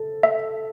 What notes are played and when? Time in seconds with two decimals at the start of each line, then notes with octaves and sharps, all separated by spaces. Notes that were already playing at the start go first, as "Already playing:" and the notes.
Already playing: A4
0.23 E5